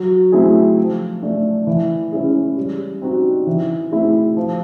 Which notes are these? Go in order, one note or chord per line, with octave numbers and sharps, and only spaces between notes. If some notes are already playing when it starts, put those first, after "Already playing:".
Already playing: F#3
A3 C4 E4 G#4
F3
A3 D4
E3
G#3 C#4 E4 G#4
G3
C4 D#4 F#4
E3
A3 C4 E4 G#4
F3